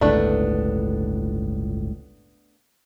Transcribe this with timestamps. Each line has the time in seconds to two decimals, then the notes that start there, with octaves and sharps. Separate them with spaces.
0.01 G1 C#2 A2 A3 B3 D4